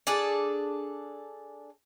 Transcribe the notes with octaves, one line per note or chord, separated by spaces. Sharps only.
D4 G#4 A4 D5